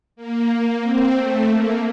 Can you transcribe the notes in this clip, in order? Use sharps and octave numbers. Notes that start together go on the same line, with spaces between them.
A#3
C4
A3
A#3